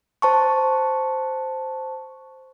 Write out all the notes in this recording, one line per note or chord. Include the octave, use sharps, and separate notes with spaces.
C5 A5 C#6